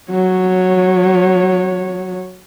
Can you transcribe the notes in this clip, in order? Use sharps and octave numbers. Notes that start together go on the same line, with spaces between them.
F#3 C#5